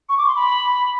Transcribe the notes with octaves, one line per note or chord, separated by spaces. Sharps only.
C#6
D6
C6
B5